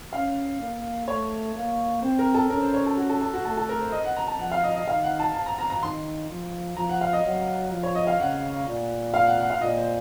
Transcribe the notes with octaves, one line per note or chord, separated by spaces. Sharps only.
C#4 F5
A#3
A3 C#5
A#3
C4 C5
A#4
A4
C#4 A#4
C5
C#5
A4
F#4
A4
A4
F#4
A3 A4
A4
A#4
C5
D#5
F#5
A#5
A5
F3 F#5
F5
D#5
D#5
D#3 F5
F#5
A5
A5
A#5
A#5
A#5
D#3 C6
F3
F3 A#5
F#5
F5
D#5
F#3
F3
C#5
D#5
F5
C#3 F#5
A#2
F5
F#5
F#5
F5
A#2 D#5
C5